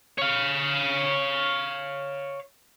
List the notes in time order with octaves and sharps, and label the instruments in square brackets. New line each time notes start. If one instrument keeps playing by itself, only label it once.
[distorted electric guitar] C#5 F5